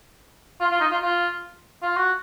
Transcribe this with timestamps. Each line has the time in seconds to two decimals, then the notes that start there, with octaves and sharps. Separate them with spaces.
0.60 F4
0.71 F4
0.81 D#4
0.91 F4
1.02 F4
1.82 F4
1.97 F#4